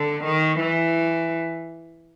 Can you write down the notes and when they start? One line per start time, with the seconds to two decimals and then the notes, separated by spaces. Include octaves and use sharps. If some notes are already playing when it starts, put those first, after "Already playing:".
Already playing: D3
0.24 D#3
0.59 E3